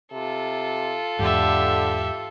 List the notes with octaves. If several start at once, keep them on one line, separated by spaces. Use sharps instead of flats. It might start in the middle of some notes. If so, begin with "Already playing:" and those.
C3 F4 A4
E2 G#2 D3 G4 E5